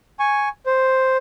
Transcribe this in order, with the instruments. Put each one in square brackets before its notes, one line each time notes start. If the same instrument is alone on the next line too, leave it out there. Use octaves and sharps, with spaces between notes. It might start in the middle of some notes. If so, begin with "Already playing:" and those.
[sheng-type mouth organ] G#5 C#6
C5